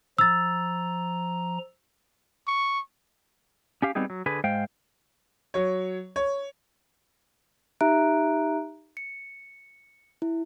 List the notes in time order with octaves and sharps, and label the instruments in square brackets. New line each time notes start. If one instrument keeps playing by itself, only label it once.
[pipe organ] F3 A#5 [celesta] E6 A6
[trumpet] C#6
[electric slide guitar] C#4 G4 F5
G3 B3 C4 D#4 G#4
F#3
D3 G#4 B4
G#2 G#3 C5 F5 G5
[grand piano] F#3 C#5
C#5
[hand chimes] D#4 G4 E5 A#5 F#6 D7
C#7
E4